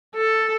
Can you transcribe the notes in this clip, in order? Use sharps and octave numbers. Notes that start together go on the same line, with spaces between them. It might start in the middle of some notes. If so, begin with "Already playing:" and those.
A4